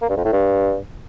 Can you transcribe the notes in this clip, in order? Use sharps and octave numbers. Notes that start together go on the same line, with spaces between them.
A#3
G2
F2
A2
G2